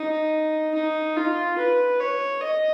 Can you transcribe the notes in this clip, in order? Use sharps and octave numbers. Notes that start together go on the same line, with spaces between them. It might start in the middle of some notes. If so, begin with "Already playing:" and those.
Already playing: D#4
D#4
F4
B4
C#5
D#5